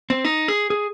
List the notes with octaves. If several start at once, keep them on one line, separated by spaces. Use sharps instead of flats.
C4
D#4
G#4
G#4